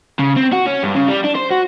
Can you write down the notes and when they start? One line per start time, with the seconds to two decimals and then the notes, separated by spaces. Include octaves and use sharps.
0.19 C#3
0.37 C4
0.53 F#4
0.66 C#4
0.83 G2
0.95 C#3
1.08 G3
1.24 D4
1.36 C5
1.52 F#4